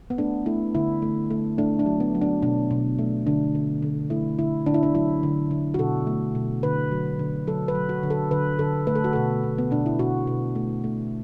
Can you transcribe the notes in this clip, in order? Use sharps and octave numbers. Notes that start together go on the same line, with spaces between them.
B3
A3 D4
A3 E4
D3 E4
A3
A3
A3 D4
D4
F#3
B3
F#3
D4
B2 D4
B2
A3
D3 D4
D3
D3
A3 E4
D3 E4
D3 D4
E4
D4
F#3 E4
D3
D3
F#4
B2 A4
A3
B2
D3 B4
F#3
D3
F#3 A4
B4
F#3
F#4
D3
A4
D3 B4
D3 A4
A3 B4
A4
F#4
B2 A4
B2
B3
B2 D4
E4
B2 F#4
B2
A3
A3